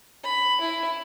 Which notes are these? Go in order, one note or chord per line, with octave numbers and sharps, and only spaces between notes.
B5
E4